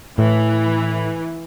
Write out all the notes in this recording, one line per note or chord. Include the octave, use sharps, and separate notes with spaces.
A2 E3